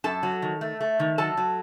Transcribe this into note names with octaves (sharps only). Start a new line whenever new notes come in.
F#2 A4 A5
F#3
D#3
A3
A3
D#3
F#3 A4 A5
F#3